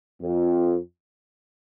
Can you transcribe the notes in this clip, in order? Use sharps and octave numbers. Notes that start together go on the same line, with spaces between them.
F2